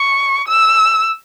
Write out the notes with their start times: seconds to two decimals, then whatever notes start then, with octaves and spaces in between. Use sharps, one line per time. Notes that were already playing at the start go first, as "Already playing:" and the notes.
Already playing: C#6
0.48 E6